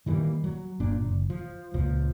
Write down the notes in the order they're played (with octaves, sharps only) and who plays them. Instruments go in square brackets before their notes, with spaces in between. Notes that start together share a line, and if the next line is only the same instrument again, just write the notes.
[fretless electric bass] D#3 E3 G3 A#3
F#3
G1 A#2 D4
F#1
F3
C#2 A#2 F3